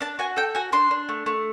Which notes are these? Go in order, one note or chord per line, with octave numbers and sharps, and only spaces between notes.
D4 A5
F#4 G#5
A4 G5
F#4 G#5
D4 C6
D4
A3
A3